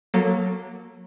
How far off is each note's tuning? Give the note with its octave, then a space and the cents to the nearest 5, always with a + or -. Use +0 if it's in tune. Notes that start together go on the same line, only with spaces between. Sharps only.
F#3 -15 A#3 +0 A4 +15